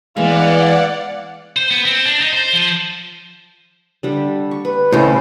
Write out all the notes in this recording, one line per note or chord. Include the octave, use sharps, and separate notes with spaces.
E3 G#3 B3 D5 F5 F#5
C5
B3
C4
D4
D#4
C5
F3
D3 G3
C#6
B4
C#2 A2 C#4 C5